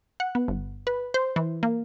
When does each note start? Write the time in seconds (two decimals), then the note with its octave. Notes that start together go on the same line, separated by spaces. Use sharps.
0.20 F#5
0.35 B3
0.48 G1
0.87 B4
1.14 C5
1.36 E3
1.63 A#3